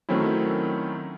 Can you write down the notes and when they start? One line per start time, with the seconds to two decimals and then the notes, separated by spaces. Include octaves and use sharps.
0.09 D#3 F#3 A3 C4 C#4 E4